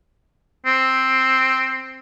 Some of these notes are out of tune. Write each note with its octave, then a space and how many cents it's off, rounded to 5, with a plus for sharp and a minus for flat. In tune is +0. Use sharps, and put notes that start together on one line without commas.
C4 +5